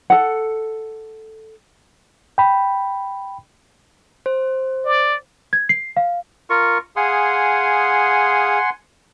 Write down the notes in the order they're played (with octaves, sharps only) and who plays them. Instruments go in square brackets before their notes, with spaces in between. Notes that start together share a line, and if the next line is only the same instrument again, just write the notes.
[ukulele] A4 F#5
[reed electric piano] G5 B5
[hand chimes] C5
[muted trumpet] D5
[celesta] G#6
C7
F5
[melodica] F4 A#4 C#6
[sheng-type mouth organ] G#4 F5 D#6 [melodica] F#5 G#5 C6